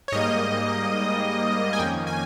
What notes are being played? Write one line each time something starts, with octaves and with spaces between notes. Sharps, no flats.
C#5
G#2 G3 A#3 D#5
G#5
F2 D#3 A#3 C#4 G5
G#5